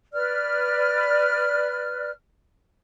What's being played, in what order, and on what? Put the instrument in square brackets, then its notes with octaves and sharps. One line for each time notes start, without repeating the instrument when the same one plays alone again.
[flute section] B4 D5 F6